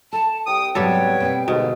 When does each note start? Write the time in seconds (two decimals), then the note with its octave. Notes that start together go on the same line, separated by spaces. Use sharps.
0.13 A4 F#5 A5
0.47 C2 G5 D#6
0.75 G#2 C3 F#3 G3 B3 A4 C#5
1.20 B2 C4 B4
1.48 D#2 G#2 B2 D3 D#5